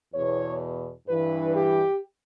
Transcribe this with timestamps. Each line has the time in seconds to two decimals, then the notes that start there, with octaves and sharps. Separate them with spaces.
0.14 E2 B2 C#5
1.08 G2 E3 B4
1.56 G4